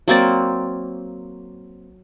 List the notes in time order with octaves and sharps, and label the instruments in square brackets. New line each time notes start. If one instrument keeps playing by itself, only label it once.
[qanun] F#3 A#3 C4 D5